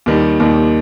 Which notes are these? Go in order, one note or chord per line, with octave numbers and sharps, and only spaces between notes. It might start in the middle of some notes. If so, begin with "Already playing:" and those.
D#2 D#3 G3
D#2 D#3 G3